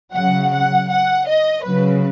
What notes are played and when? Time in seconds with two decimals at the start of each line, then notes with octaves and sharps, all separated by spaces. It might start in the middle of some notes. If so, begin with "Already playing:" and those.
0.13 C#3 F#3 F#5
0.51 F#5
0.89 F#5
1.27 D#5
1.64 C#3 F#3 B4